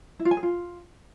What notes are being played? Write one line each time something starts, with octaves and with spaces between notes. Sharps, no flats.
E4
F4
G#5
G#4
F4